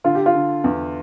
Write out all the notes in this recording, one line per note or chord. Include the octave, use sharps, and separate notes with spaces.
D3 F4
G4
F4
D3
E2